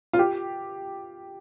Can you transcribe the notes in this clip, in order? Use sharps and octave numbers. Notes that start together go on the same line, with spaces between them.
F4
G4